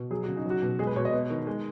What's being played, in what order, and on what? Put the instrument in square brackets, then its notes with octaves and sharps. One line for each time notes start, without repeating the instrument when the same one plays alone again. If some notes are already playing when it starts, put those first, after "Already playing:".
Already playing: [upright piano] B2
F#3 G#4
C#3 F#4
D#4
F#3 F#4
B2
G#3 G#4
B4
B2 C#5
D#5
B3
D#3
G#3